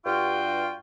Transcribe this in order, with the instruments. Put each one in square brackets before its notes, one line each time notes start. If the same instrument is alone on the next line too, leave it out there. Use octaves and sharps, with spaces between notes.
[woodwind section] G2 F4 F#4 G5